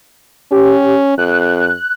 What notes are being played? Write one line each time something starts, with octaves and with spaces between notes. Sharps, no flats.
C#4 G4
F2 F#6